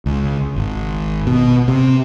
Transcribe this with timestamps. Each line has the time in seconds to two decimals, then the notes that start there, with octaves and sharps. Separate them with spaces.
0.06 C#2
0.56 G#1
1.27 B2
1.68 C3